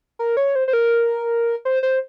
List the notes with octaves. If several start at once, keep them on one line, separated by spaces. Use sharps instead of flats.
A#4
C#5
C5
C5
A#4
C5
C5